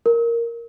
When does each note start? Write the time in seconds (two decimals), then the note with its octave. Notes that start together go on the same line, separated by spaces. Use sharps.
0.06 A#4